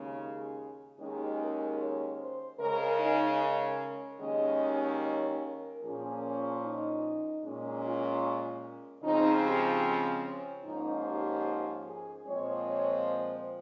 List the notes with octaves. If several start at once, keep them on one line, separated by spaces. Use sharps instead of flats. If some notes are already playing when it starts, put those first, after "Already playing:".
Already playing: D#2 C#3 G#3 C#4
G#4
D#2 D#3 G#3 C#4 G#4
A#4
C#5
C5
C#3 G#3 C#4 A#4
D#4
A#4
D#2 D#3 G#3 C#4 D#5
C#5
A#4
A#2 F3 A#3 C#4 G#4
D#4
A#2 G#3 C#4
F4
C#3 F3 G#3 C4 D#4
G4
C#4
G#2 F3 A#3 C#4 D#4
G4
G#4
A#2 F3 G#3 C4 C#5
C#5
C5